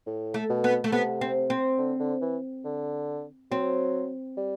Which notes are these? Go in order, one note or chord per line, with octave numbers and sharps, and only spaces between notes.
A2
A3
B2
B3
A3
C3 B3
C4
C4
D3
D3
E3
D3
F#3 C4
G3